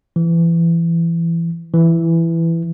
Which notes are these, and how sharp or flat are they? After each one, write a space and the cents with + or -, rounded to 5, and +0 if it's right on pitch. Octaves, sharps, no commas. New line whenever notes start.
E3 +25
E3 +10